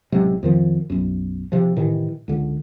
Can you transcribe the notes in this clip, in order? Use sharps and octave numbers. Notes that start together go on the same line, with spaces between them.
A1 C3 F#3 G#3
F2 D#3 F3
B1 F#2
C3 F3
A2 C3 D#3 E3
C#2 D3